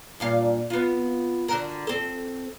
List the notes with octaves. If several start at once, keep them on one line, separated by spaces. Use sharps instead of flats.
G2 A#2 F5
B3 F4
D3 F#4 A#4
C4 A4